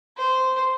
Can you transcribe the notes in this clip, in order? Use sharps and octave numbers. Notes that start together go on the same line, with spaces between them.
C5